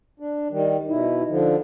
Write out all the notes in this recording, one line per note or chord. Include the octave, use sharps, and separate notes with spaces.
D4
D#3 G3
B2 D#4 E4
D3 F3